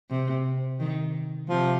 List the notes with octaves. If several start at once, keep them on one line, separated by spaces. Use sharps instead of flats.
C3
D#3
C3 F3